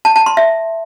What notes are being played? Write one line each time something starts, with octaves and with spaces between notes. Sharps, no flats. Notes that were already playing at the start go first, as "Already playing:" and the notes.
A5
A5
C6
E5